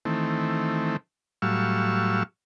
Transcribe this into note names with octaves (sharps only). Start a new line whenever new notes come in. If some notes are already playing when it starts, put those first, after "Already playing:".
D#3 E3 A3 C4
A2 F#3 G3 F5 C#6 E6